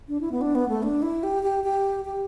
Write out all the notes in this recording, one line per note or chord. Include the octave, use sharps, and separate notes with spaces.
D4
E4
B3
D4
B3
A3
D4
E4
G4
G4
G4
G4